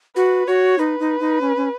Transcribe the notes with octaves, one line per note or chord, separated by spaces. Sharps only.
F#4 B4
F#4 C#5
D#4 B4
D#4
D#4
C#4
C#4